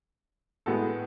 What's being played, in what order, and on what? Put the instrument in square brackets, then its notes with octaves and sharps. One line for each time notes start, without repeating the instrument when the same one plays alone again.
[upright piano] A2 G#3 B3 F#4 A4